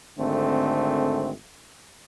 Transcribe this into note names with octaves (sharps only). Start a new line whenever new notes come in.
G#1 D3 A3 C4